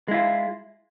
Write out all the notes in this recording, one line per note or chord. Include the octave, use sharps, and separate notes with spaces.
G#3 E4 F4